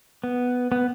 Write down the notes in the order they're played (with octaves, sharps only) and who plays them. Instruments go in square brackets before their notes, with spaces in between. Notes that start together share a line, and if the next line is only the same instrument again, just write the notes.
[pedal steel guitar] B3
B3